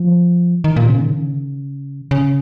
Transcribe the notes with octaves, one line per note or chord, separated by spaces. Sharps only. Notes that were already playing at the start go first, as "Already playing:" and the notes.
Already playing: F3
D#3
A#2
C#3
D#3
C#3
C#3